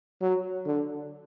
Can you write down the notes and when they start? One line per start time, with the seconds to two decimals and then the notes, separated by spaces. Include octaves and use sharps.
0.21 F#3
0.66 D3